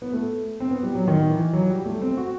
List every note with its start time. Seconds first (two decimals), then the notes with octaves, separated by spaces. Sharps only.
0.02 B3
0.13 A3
0.60 C4
0.71 B3
0.83 G3
0.95 F#3
1.08 D#3
1.30 E3
1.53 F#3
1.70 G3
1.86 A3
2.02 C4
2.17 F#4